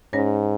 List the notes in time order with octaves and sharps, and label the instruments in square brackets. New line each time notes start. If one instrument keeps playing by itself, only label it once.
[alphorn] G#2 [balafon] C#4 C#5